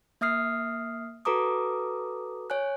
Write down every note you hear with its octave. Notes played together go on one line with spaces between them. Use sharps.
A#3 E5 D#6 F6 C7
F#4 A4 B4 A#5 D6 D#6
C#5 G#5 F#6